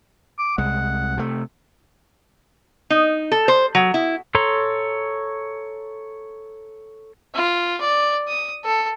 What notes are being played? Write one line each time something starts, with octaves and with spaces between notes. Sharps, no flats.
D6
C2 G#3 F#5
C3 A3
D#4
A4
C5
F#3
E4
A4 C#5 A#5 C6
F4
D5
D#6
A4